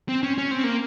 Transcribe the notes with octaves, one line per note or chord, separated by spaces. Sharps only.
C4
C#4
C#4
C4
A#3